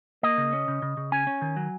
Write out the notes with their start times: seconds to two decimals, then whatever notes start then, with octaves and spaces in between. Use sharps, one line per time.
0.23 A#3 D#5
0.38 C#3
0.53 C#4
0.68 C#3
0.82 C#3
0.97 C#3
1.12 C#4 G#5
1.27 C#4
1.42 D#3
1.56 F#3